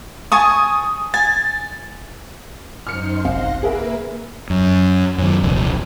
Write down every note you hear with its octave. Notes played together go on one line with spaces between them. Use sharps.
G#5 A5 C#6 D#6
G#5 A6
F#2 D#4 C5 F6 C#7
G1 C2 C4 F5 F#5 C6 A#6
A#3 G#4 A#4 B4 E5
F#2
F#2 D#3
D#1 C2 F3